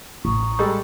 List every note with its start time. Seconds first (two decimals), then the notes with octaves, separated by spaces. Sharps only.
0.25 A1 A#5 C#6 D#6
0.59 G3 G#3 A4